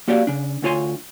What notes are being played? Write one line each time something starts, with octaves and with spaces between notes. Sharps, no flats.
A#3 F#4 G4 D5 F5
C#3 D4
D2 D3 F4 C#5 G#5 C6